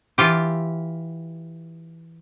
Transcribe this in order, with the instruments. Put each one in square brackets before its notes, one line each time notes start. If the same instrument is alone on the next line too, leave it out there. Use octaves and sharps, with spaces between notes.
[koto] E3 F4 G4